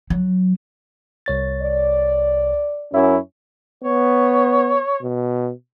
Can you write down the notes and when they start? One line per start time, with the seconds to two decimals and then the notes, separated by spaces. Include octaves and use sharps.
0.10 F#3
1.26 C2 C#5 A6
1.61 D5
2.93 F#2 C#4 E4
3.84 B3 C#5
5.02 B2